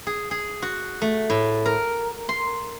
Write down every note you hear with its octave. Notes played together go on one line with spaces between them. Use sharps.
G#4
G#4
F#4
A3
A2
A#4
C6